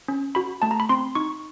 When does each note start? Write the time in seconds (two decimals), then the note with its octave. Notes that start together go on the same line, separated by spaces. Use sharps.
0.08 C#4
0.35 F#4 B5
0.62 A3 A5
0.71 A#5
0.80 B5
0.89 C4 C6
1.15 D#4 C#6